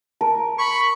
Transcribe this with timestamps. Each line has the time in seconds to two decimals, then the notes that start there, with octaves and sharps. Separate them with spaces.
0.21 A#4 A5
0.59 B5 C#6